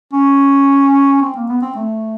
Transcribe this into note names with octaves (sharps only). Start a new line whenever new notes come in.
C#4
C4
A#3
B3
C4
A3